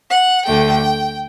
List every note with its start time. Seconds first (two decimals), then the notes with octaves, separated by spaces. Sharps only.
0.09 F#5
0.45 D2 D3 A3 G5